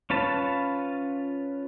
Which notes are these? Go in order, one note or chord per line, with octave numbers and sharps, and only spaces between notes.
C#4 F4 B4 A5